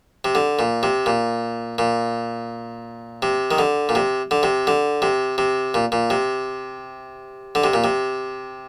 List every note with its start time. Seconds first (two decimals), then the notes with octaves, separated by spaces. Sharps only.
0.25 C3
0.35 D3
0.59 A#2
0.83 C3
1.06 A#2
1.78 A#2
3.22 C3
3.51 D#3
3.58 D3
3.89 A#2
3.95 C3
4.31 D3
4.43 C3
4.67 D3
5.02 C3
5.38 C3
5.74 A#2
5.92 A#2
6.10 C3
7.55 D3
7.64 C3
7.74 A#2
7.84 C3